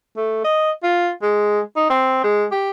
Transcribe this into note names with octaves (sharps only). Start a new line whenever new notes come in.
A3
D#5
F4
G#3
D#4
C4
G#3
G4